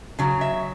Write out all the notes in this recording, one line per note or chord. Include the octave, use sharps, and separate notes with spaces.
C#3 F#3
E5